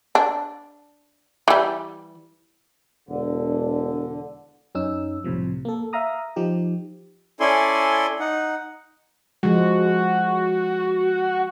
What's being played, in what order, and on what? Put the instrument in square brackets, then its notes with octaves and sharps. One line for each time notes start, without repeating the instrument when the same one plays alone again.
[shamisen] D4
E3 G3
[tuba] E1 [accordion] D3
[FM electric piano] F#2 C#4 D#4 E6
C2 A2 C3 F3
A#3 A4
E5 F5 A#5 D#6
F3 D#4 G4
[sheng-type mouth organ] C#4 E4 A4 D5 G#5 C6
D#4 F#5
[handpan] F3 G#3 [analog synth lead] F#4